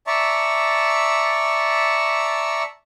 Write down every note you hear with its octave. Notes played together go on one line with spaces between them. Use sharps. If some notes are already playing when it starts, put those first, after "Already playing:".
D5 E5 A5 A#5 C#6